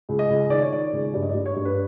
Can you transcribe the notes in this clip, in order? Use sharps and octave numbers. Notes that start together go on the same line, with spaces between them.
C#2
D#5
C#2
D#3 D5
C#5
D#3 D5
C#2
G2 D5
D#5
G2 D5
C#5
G2
B4